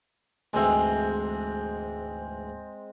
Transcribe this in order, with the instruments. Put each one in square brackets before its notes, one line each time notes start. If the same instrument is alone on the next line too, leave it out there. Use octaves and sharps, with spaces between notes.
[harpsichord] D2 G#2 E3 [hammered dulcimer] G#3 C4